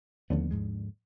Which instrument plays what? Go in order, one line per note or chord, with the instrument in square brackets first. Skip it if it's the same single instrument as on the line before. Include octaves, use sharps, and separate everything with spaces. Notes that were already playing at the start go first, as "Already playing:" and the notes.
[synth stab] D#2 D3 [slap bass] F3 A3 B3
[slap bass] G#2 F3 G#3